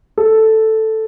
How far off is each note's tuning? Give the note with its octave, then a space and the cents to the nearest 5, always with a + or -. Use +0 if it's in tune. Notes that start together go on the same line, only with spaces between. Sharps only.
A4 +0